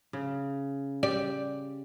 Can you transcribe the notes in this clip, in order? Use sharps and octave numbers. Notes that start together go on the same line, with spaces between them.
C#3
G4 D5